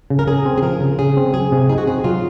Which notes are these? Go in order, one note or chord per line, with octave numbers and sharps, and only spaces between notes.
C#3
A#4
C#3 G#4
C4
G#4
F3 A#4
C#3
C#3 G#4
C4
F#3 G#4
C3
D#4 G#4
F#4
C4 G#4
F#3 F4